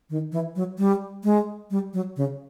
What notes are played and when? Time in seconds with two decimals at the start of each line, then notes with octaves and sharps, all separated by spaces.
0.10 D#3
0.32 E3
0.56 F#3
0.78 G3
1.24 G#3
1.71 G3
1.94 F#3
2.17 C#3